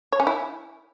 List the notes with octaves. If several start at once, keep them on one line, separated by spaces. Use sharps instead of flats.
C#5
C#4
E4